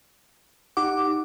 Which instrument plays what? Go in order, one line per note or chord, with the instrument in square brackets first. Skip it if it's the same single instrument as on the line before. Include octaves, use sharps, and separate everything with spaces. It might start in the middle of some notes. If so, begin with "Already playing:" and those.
[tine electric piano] D#4 G4 F#5 [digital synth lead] D6